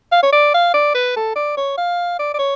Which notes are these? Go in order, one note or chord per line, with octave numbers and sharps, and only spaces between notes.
F5
C#5
D5
F5
D5
B4
A4
D5
C#5
F5
D5
D5
C#5